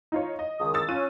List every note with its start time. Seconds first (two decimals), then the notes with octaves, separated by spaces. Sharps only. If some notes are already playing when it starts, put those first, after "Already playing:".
0.12 D#4 F4 C#5
0.39 D#5
0.59 C#2 D#3 D#6
0.74 E6 A6
0.88 C#4 F4 F#6 D#7